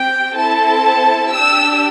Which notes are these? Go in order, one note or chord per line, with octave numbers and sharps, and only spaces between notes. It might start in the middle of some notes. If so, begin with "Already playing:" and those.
Already playing: C4 G4 G5
C4 E4 A4 A5
D4 G4 E6